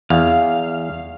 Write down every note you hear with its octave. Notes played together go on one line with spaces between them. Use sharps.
E2 F5